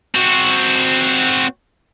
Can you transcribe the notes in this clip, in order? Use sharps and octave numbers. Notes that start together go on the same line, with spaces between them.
C4 F#4